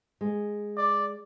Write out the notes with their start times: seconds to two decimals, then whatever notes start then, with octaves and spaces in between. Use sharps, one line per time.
0.21 G#3
0.77 D5